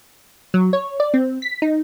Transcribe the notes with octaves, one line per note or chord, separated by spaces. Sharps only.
F#3
C#5
D5
C4
B6
D#4